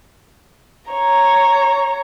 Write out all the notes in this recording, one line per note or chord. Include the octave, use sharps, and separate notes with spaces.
C#5 A#5